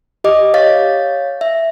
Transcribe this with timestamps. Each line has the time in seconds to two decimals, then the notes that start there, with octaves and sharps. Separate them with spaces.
0.24 G4 D#5 D6
0.54 C#5 F5 A6
1.41 E5